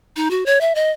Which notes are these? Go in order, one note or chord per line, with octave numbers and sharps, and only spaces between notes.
D#4
F#4
C#5
E5
D#5